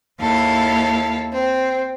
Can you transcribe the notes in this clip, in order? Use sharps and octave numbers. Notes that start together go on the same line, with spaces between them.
D#2 E4 A4 F5
C4